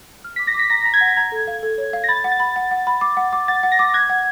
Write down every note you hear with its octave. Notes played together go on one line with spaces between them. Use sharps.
F6
D6 B6
A#6
D6
B6
A#5 A#6
A#5
G#6
F#5
A#5 G#6
A4
F5
A4
C#5
F5
A#6
B5 A6
F#5
A6
B5
F#5
F#5
B5
D6
F#5
D6
F#5 A6
F#5
A#6
D6
F#6 G#6
F#5